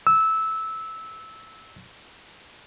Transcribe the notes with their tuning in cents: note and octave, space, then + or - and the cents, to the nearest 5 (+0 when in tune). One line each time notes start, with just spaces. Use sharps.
E6 -15